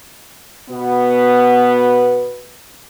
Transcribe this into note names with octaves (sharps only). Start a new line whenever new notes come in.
B2 B3